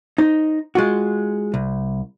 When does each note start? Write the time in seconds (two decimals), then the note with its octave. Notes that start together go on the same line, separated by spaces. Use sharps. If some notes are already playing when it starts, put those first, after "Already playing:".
0.18 D#4 C5
0.75 G#3 F4 F#4
1.54 C2